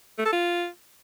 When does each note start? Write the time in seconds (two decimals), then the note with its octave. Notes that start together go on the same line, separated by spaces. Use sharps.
0.18 A3
0.25 A4
0.33 F4